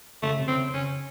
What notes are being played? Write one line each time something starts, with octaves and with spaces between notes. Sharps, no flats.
C#3 A3
C3
C#3 C4
C#3 C#4